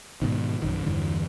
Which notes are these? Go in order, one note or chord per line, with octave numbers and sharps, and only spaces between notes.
G#2 B2 D#3
A#1 F#2 D#3
E2 G2 D3 E3